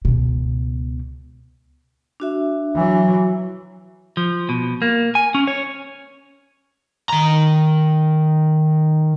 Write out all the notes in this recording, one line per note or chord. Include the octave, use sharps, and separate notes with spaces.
C#2 B2
D4 F#4 E5
E3 F#3
F3
B2
A#3
G#5
C#4
C#5
D#3 A#5